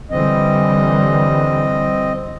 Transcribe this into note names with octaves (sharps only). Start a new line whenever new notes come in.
D3 E3 G3 C4 D#5